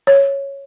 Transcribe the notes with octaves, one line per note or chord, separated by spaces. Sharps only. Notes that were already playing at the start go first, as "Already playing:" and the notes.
C#5